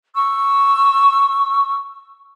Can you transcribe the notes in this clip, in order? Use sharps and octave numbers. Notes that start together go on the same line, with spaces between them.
C#6 E6